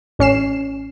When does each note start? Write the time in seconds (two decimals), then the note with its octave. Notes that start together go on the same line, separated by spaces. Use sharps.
0.19 A1 C#4 C7 E7